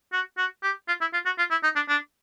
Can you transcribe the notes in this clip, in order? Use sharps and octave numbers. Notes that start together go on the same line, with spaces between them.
F#4
F#4
G4
F4
E4
F4
F#4
F4
E4
D#4
D4
D4